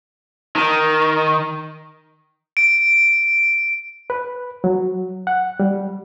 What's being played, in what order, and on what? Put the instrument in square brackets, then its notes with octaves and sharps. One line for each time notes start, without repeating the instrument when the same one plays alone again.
[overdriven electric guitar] D#3
[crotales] D7
[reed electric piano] B4
F#3
F#5
G3